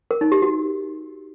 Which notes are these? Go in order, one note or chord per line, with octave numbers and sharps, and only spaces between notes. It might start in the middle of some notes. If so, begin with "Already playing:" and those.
A#4
D#4
G4
F#4